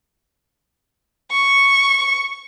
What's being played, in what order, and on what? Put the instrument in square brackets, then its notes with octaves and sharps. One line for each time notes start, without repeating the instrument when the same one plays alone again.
[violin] C#6